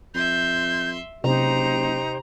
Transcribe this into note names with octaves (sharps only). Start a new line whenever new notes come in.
F2 E5 C6 G6
F#1 C3 D#4 G4 C5 A#5